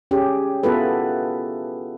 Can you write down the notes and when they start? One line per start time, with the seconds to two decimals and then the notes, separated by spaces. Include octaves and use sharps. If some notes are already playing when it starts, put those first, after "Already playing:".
0.11 C#4 G4 G#4
0.63 B3 E4 F4 G#4 A4 B4